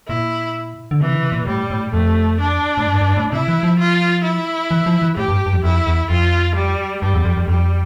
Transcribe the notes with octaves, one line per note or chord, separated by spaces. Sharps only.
A#2 E4
D3
C3 E3
D3
C3
A#2
A2 G3
A2
F2 A3
D4
A2
G2
G2
A2
C3 E4
E3
F3
F4
E4
E3
F3
E3
A2 G4
G2
G2
F2
F2 E4
E2
F2 F4
G3
G2 G3
E2
F2
F2
F2 G3